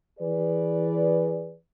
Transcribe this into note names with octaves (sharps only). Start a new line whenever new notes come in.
E3 G#4 B4 D5